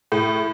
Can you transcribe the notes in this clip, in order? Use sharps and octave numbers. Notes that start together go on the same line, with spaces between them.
A2